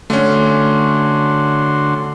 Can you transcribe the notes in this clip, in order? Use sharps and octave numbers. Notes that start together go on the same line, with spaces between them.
D3 A3 C#4 F#4 C6